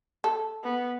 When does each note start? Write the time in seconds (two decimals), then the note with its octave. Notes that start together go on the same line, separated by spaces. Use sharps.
0.24 A4
0.63 B3